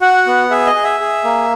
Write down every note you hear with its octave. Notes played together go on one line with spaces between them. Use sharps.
F#4 F#5
B3
G#4 E5
D#5
G#4
E5
G#4
A#3